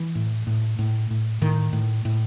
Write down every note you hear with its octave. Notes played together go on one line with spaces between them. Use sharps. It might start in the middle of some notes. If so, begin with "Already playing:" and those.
Already playing: E3
A2
A2
A2
A2
A2 D#3
A2
A2